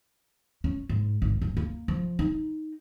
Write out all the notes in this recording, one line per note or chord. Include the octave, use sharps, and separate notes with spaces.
C#4
G#2
G#1
D1
A#3
F3
D#4